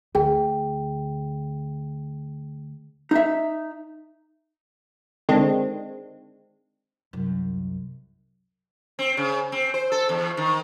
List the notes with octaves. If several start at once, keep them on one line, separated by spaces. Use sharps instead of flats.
D2 G#4 G5
D#4 E5
D3 D#3 G#3 C4 D4
C2 F#2
C4
C#3
C4
C5
A4
E2
D#3